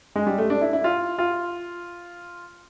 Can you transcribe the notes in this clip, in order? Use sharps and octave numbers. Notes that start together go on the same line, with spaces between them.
G#3
G3
A3
D4
E4
E4
F4
F4